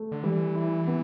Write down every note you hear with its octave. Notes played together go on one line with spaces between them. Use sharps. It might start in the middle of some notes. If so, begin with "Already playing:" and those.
Already playing: A3
D3
E3 G3
E4
B3